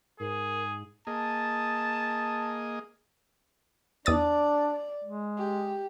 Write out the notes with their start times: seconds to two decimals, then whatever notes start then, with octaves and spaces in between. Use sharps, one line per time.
0.20 G#2 G#4 A#4
1.07 A#3 G#4 D#5 A5
4.06 E2 D4 D5 D#6 A6
5.04 G#3
5.38 G4